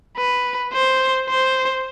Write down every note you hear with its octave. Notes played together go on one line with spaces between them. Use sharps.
B4
C5
C5